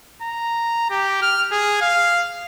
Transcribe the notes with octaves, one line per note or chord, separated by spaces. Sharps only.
A#5
G4
F6
G#4
F5